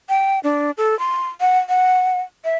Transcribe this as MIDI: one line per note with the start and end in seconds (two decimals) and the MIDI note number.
0.09 0.39 79
0.44 0.71 62
0.77 0.98 69
0.99 1.29 84
1.41 1.59 78
1.69 2.21 78
2.45 2.57 76